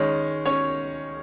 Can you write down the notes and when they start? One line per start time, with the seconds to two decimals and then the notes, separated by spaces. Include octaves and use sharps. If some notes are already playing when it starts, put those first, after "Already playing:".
Already playing: D#3 G#3 C#4 C#5
0.46 C#4 C#5